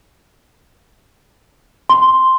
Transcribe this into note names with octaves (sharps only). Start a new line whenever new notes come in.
C6